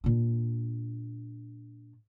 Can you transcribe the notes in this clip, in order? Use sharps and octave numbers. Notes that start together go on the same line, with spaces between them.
A#2 D4